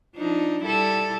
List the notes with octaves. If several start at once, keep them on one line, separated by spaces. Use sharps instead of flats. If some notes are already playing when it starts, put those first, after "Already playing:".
F3 D4 D#4
G3 E4 A4